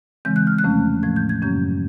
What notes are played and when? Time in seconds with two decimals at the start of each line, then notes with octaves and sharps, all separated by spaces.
0.25 C#3 E3 G#3 C4 G6
0.36 F#6
0.47 F6
0.58 F#6
0.64 E2 C3 F3 A3 C#4
1.03 A2 F3 A3 G#6
1.16 G6
1.29 G#6
1.42 F#2 C#3 F#3 A#3 C#4 G6